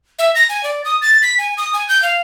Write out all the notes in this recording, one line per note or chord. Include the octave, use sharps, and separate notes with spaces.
E5
A#6
G#5
D5
D#6
A6
B6
G#5
D#6
G#5
G6
F5